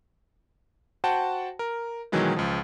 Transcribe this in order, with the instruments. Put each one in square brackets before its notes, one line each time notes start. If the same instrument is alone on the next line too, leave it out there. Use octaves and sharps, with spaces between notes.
[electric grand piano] F#4 C5 F#5 G5 A5
A#4
B2 D#3 E3 F#3 G#3 E4
C#2 F3